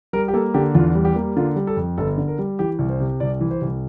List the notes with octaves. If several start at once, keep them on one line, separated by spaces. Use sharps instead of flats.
G3 A#4
G4
A#3 A4
D3 G4
E2 F4
G3
G4
A#3
D3 F4
G3
A4
F2
G1 A4
D3
A#4
G3
E3 G4
C2
C5
C3
C2 D5
E3
C5
C2